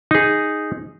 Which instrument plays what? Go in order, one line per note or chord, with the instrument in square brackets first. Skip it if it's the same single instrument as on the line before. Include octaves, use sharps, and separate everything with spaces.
[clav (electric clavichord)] D#4 G#4